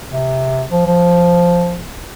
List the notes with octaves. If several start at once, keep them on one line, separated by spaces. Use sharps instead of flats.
C3
F3
F3